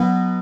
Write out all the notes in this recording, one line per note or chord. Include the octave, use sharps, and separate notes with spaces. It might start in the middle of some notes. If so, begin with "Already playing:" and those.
Already playing: B2 F#3 B3